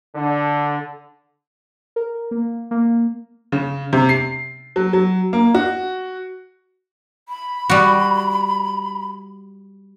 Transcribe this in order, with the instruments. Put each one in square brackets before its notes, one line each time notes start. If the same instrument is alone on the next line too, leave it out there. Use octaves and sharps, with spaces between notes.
[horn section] D3
[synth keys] A#4
A#3
A#3
[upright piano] C#3
C3
C7
F#3
F#3
A#3
F#4
[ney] B5
[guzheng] G3 F#4